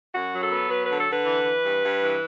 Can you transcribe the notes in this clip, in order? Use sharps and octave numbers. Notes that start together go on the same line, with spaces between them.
F#2 F#4
F#3
A4
B3
F#3 B4
B4
D3
A4
D3 B4
E3
E3
G2
G2
E3